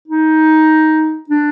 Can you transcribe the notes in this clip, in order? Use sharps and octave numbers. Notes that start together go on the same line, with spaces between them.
D#4
D4